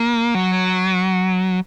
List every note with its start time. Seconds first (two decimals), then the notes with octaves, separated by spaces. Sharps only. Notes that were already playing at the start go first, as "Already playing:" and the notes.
Already playing: A#3
0.35 F#3